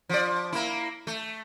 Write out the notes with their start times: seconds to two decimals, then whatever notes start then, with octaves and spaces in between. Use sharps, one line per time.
0.09 F3 D5
0.52 A#3 E4
1.07 A3